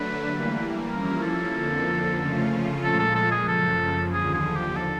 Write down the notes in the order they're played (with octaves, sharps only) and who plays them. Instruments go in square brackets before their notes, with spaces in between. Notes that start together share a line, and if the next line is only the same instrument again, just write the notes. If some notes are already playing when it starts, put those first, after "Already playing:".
Already playing: [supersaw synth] D3 F#3 A3 D4 [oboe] B4
[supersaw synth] E3 G3 A#3
[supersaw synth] F3 A#3 C#4 E4 [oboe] A#4
[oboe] A4
[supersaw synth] F2 D3 F3 A#3
C#3 F3 A3 C#4 F4
[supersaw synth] A#2 F3 G#3 [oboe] A4
[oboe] A4
A4
G#4
[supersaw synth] F#2 C#3 F3 [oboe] A4
[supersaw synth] D#2 D3 F3 [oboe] G#4
[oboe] G#4
G4
A4